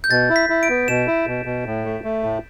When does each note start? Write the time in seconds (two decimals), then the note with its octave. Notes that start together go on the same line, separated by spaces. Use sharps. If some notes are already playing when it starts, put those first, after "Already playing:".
0.04 G6
0.10 B2 A6
0.30 E4
0.36 B6
0.49 E4
0.63 D7
0.69 B3
0.88 B2 E7
1.07 E4
1.27 B2
1.45 B2
1.66 A2
1.85 A3
2.04 A3
2.23 A2